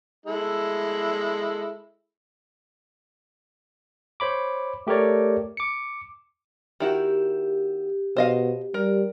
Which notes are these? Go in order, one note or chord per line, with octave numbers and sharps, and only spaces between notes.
G#3 E4 A4
C5 C#5 B5 D6
A3 G4 A4 A#4 C#5 D5
D6 C#7
D#3 E4 F#4 G4
B2 C5 D#5 F5
G3 A#4